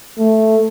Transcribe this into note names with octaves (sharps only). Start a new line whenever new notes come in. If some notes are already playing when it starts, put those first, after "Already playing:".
A3